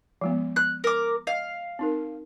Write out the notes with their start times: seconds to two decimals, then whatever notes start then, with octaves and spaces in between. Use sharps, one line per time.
0.21 F3 G#3 B3
0.56 F#6
0.84 A#4 D6
1.27 D#5 F5
1.79 C4 D#4 A#4